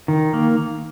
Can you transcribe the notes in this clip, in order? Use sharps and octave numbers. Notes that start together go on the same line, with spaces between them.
D#3
A#3